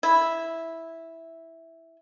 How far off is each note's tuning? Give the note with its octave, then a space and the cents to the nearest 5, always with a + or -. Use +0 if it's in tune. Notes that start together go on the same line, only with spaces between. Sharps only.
E4 -5